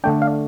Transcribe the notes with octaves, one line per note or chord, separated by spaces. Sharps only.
D3 A3 D4 G5
F5